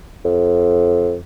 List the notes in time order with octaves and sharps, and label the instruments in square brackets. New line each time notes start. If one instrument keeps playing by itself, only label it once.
[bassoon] F2